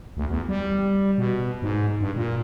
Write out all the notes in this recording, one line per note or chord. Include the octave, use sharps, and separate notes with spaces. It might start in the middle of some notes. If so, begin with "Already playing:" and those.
D2
E2
G3
B2
G#2
G2
A#2